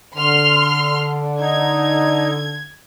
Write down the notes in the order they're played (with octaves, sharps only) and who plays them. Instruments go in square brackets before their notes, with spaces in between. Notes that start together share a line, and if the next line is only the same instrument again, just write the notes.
[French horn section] D3 [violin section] C6 F6
[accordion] D#4 [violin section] G#6